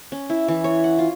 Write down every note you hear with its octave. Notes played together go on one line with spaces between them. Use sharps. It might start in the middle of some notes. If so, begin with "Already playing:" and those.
C#4
E4
E3
C#5
F#5
F4